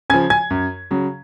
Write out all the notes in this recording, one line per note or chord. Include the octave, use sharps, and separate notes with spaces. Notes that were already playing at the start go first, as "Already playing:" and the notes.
C#3 F3 G#5 G#6
G#5 G#6
F#2
C#3 F#3